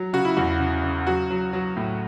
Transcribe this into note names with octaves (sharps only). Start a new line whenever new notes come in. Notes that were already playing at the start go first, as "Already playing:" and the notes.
Already playing: F#3
C#3 F#4
E4
E2 F#4
C#3
C#3
F#3 F#4
F#3
F#3
A2